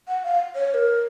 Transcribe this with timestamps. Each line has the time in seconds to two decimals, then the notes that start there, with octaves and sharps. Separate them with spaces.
0.08 F#5
0.24 F5
0.55 C#5
0.70 C#5
0.74 A#4